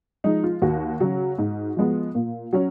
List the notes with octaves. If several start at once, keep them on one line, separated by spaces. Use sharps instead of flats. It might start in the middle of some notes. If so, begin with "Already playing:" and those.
F3 G#3 D#4
F4
D#2 F#4
C#3 F#3 C#4
G#2
F3 G#3 B3
A#2
F#3 C#4